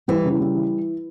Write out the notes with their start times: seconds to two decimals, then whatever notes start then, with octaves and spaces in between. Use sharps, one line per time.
0.08 E3 G3
0.25 C#3
0.40 G3
0.55 E3